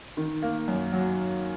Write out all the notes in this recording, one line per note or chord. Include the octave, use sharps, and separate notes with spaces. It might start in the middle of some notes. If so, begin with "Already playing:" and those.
D#3
A#3
F#2
F#3